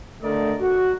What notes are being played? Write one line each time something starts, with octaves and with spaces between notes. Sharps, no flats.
D3 A3 A#4 D5 D#5
F#4